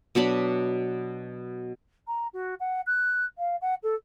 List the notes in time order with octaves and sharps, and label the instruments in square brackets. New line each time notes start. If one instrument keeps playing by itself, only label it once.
[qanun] B2 F#3 D4 B5
[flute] A#5
F#4
F#5
F#6
F5
F#5
A4